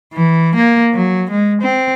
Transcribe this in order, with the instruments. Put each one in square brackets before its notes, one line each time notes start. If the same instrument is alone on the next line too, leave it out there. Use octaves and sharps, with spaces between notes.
[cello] E3
A#3
F#3
G#3
C4